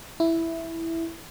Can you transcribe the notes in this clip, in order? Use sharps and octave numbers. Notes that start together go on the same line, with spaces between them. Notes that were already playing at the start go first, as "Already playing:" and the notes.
E4